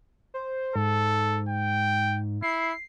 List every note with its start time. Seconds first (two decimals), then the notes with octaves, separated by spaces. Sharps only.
0.34 C5
0.76 G#2 A4
1.49 G5
2.43 E4 C7